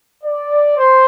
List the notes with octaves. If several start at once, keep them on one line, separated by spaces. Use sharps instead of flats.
D5
C5